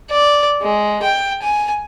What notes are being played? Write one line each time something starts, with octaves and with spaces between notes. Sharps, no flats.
D5
G#3
G5
G#5